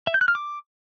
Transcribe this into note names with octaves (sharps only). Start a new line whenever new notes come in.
E5
G6
F#6
F6
D6